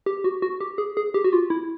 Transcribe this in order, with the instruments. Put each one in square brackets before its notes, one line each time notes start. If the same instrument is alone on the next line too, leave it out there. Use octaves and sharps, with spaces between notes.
[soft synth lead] G4
F#4
F#4
G4
G#4
G#4
G4
F#4
F4
E4